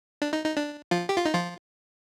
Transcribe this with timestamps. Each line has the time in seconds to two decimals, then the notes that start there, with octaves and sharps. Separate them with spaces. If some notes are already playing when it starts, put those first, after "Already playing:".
0.22 D4
0.33 D#4
0.45 D#4
0.57 D4
0.91 F3 F4
1.09 G4
1.17 F4
1.25 D#4
1.34 F3 F4